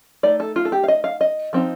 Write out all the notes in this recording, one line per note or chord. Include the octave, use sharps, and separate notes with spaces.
A3 D#4 D5
A4
F4
A4
G4
F5
D#5
F5
D#5
F3 C4 D#4